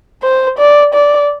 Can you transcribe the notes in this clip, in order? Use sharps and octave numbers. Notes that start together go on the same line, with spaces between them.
C5
D5
D5